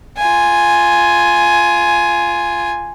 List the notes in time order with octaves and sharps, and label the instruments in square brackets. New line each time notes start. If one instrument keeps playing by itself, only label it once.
[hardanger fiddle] F4 G#5